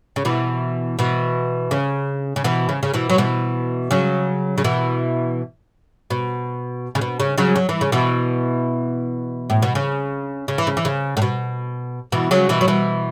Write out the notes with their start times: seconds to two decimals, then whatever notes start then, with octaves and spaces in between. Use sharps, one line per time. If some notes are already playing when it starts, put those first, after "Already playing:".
0.16 C#3
0.25 B2 E3
0.99 B2 E3
1.71 C#3
2.36 C#3
2.44 B2 E3
2.69 C#3
2.83 C#3
2.94 B2 E3
3.10 F#3
3.18 B2 E3
3.91 C#3 F#3
4.58 C#3
4.64 B2 E3
6.10 B2
6.95 C#3
7.01 B2
7.20 C#3
7.38 C#3 F#3
7.56 F#3
7.69 E3
7.81 C#3
7.92 B2 E3
9.50 A2
9.62 B2
9.75 C#3
10.48 C#3
10.58 E3
10.67 C#3
10.77 E3
10.85 C#3
11.17 A2
11.22 B2
12.12 B2 E3
12.31 C#3 F#3
12.49 B2 E3
12.61 F#3
12.68 B2 E3